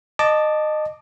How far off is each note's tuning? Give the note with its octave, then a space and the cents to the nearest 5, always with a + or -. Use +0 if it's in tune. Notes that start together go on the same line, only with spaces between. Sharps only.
D#5 -20 A5 +0 D6 +0